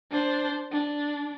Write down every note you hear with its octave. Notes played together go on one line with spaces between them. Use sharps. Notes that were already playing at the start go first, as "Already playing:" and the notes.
D4 C5
D4